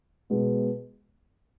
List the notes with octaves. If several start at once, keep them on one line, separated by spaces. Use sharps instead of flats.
B2 G#3 B3